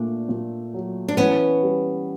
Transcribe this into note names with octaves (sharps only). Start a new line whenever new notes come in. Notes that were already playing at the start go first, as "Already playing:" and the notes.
Already playing: A#2 A3 D4
A#2
F#3
D4
E3 B3 C#4
G3